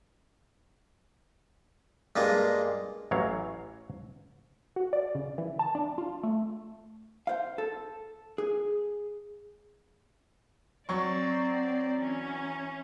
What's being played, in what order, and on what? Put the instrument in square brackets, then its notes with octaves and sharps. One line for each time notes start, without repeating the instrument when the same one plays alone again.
[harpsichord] G2 G#3 A#3 F4
[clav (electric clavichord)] A1 E3 F#3 C#5 F5
[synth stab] F#4
D5
C#3
E3
A5
D4
F4
A3
[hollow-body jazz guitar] C5 F5
A4
G#4
[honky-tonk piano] F#3 C#6 [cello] C4 D5
[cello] E3 C#4